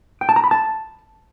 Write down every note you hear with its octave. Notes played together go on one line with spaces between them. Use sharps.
G5
A5
A#5
B5
A5